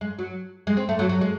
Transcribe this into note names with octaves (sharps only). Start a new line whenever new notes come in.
G#3
F#3
G#3
C4
A3
F#3
F#3
G#3